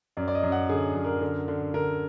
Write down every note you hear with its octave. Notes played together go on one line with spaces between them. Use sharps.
F#2 D5
D5
D#5
F#2
F#5
D3 G#4
F#2
A#4
D3
D3
D3 A#4